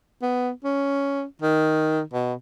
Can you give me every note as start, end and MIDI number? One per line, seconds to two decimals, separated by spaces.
0.22 0.50 59
0.64 1.23 61
1.42 2.01 51
2.13 2.33 47